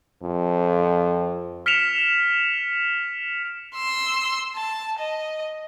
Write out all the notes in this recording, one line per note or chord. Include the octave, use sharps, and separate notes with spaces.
F2
F6 B6 C#7 D7 E7 F7
C6 E6
A5
D#5